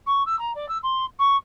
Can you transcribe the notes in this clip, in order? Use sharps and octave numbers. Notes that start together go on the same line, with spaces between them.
C#6
E6
A#5
D5
E6
C6
C#6